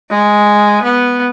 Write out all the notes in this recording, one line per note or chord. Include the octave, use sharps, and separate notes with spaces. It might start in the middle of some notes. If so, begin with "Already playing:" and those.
G#3
B3